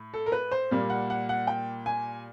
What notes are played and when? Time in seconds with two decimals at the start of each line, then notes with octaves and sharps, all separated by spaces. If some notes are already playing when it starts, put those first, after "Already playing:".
Already playing: A2
0.14 A4
0.26 A#4
0.32 B4
0.52 C5
0.71 A#2 G3 A#3
0.90 F#5
1.10 F#5
1.29 F#5
1.47 G5
1.86 G#5